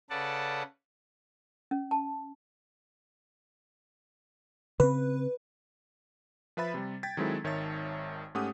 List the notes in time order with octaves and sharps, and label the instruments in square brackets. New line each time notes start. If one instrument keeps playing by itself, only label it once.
[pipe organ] C#3 A4 B4 D5 F#5 A5
[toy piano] C#4
A5
[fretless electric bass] C#3 C4 [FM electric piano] B4
[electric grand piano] F3 B4 E5 B5 A6
C3 G3
G5 G#6 A6 B6
D#3 F#3 G#3 C4 E4 A4
G#1 D#3 C#5 E5 A5 A6
G#2 A3 C#4 G4 F#5 D#6